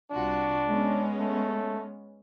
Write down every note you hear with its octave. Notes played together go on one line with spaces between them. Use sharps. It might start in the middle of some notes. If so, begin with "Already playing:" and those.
C2 D4 F4 F#4
G#3 B3 C#4
A3